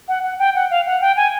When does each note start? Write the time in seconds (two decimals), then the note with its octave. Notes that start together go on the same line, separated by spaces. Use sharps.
0.08 F#5
0.24 F#5
0.39 G5
0.55 F#5
0.71 F5
0.86 F#5
1.01 G5
1.17 G#5